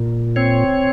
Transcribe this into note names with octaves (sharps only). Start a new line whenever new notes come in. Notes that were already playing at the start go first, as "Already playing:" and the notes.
Already playing: A#2
C4 C#5